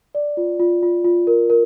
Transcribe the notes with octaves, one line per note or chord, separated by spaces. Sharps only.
D5
F4
F4
F4
F4
A#4
A#4